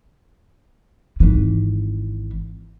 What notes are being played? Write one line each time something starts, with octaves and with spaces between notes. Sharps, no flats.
G#1 E3